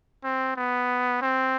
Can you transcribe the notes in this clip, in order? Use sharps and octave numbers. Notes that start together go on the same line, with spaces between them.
C4
B3
C4